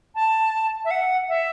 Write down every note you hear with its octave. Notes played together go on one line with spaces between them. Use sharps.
A5
E5
F#5
E5